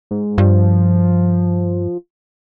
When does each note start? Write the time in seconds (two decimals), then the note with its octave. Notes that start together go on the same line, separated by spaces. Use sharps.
0.11 G#2
0.38 G2 F3